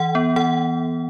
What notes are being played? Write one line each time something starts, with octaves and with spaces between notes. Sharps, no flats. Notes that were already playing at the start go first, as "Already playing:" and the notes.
Already playing: E3 F#5
B3
E3 F#5